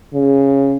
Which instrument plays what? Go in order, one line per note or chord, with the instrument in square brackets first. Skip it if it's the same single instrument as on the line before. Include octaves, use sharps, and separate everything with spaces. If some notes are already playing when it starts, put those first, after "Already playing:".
[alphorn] C#3